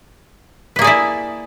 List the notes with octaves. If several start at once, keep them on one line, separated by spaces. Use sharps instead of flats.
A#3 E4 G#4 B4 D5